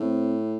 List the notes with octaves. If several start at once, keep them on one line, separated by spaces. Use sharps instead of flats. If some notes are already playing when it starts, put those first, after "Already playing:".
Already playing: A2 C4